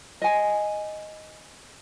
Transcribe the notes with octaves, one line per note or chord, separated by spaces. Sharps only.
D#5 G#5